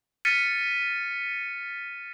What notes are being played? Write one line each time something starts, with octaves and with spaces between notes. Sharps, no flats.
F6 A6 B6 C#7 D#7